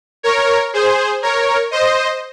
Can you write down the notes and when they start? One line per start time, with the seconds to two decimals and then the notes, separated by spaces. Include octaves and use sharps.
0.23 A#4 C#5
0.74 G#4 C5
1.22 A#4 C#5
1.71 C5 D#5